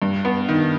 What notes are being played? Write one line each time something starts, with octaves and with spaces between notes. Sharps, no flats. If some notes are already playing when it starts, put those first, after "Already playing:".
G2
B3
D#3